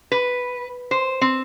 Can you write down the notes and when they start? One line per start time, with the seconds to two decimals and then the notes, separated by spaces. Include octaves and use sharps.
0.12 B4
0.91 C5
1.21 C4